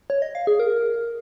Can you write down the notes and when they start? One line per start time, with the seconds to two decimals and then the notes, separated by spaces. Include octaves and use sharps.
0.10 C#5
0.22 D#5
0.35 F5
0.47 G#4
0.60 A#4